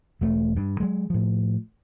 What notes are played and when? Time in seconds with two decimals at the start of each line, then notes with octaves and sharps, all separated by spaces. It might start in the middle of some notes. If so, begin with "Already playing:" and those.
0.21 E1 A3
0.57 G2
0.80 F#3 G#3
1.10 A2 F3